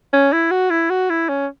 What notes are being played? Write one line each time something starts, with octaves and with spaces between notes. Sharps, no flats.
C#4
E4
F#4
E4
F#4
E4
C#4